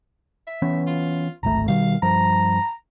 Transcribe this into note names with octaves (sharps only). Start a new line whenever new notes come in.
E5
E3 B3 C#4
F4
D1 G#1 A3 A#5
B2 D#3 G3 F5
G2 F3 A#5